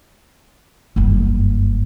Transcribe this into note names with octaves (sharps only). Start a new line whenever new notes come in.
F#1 G2